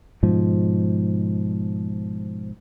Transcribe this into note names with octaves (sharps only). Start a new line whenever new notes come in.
G#2 B2 F3